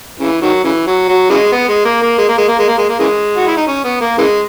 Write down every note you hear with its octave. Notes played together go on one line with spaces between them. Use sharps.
C#3 E3
D#3 F#3
C#3 E3
F#3
F#3
C#3 E3 G#3
B3
G#3
A#3
A#3
G#3
A#3
G#3
A#3
G#3
A#3
G#3
A#3
C#3 E3 G#3
F#4
E4
D#4
C#4
B3
A#3
C#3 E3 G#3